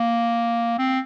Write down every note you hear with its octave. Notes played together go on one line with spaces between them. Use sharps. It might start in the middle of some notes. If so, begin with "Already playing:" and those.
Already playing: A#3
C4